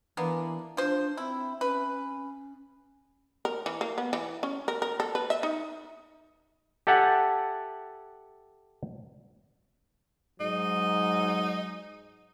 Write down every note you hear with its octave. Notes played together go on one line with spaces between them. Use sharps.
E3 A#3 B3 D4
F3 D4 C5
C4 E4
C#4 B4
A#4
E3
A#3
B3
E3
C#4
A#4
A#4
A4
B4
E5
D#4
G4 A4 E5 F#5 G#5 A5
G#2 F#3 D#4